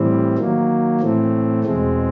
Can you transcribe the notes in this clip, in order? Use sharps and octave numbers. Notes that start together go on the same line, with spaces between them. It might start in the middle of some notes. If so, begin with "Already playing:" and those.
Already playing: A2 E3 G3 C4
D#3 F#3 A#3
A2 E3 A3 C4
E2 B2 G#3 C4